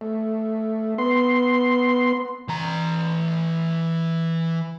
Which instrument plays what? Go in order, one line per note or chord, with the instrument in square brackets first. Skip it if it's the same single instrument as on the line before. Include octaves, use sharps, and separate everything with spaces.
[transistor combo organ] A3
B3 C6
[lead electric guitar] E3 A#5